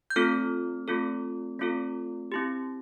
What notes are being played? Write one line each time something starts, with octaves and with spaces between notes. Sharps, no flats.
G6
A3 C4 F4 A4 F6
A3 C4 F4 A4
A3 C4 F4 A4
C4 E4 G4